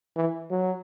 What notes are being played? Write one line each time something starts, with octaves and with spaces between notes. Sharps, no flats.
E3
F#3